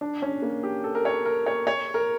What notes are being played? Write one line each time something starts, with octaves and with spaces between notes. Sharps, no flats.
D4
C#4
A#3
G4
A4
A#4
C#5
A#4
C#5
C#5
A#4